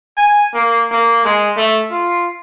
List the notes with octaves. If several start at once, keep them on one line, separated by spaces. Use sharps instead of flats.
G#5
A#3
A#3
G#3
A3
F4